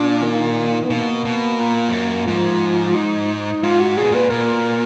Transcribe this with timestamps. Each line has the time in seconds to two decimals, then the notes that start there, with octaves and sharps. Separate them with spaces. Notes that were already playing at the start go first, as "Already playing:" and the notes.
Already playing: A#2 D4
0.23 D#3
0.85 B3
0.90 B2 A#3
1.25 B2
1.59 A#2
1.89 F2
1.92 F#2
2.26 G#2 F3
2.95 D#4
3.63 G#2 F4
3.80 F#4
3.97 A#2 G#4
4.04 B2
4.11 A#2 B4
4.30 A#2 A#4